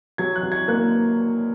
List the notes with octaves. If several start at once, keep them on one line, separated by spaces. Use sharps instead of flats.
F#3 G#6
F#6
F#3
G#6
A#3 F#6